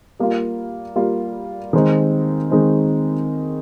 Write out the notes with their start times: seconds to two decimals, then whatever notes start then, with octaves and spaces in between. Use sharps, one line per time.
0.19 G3 A#3 F4
0.96 G3 A#3 F4
1.73 D#3 G#3 C4 D#4
2.51 D#3 G#3 C4 D#4